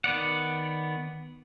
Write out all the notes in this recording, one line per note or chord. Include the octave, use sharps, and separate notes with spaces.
D#3 B3 D5 F#5